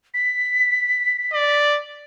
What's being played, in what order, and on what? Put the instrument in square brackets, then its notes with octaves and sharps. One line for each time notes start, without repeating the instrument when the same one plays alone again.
[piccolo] B6
[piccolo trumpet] D5